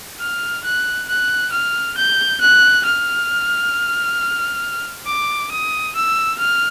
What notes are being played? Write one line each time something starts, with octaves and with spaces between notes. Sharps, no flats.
F6
F#6
F#6
F6
G6
F#6
F6
D6
D#6
E6
F6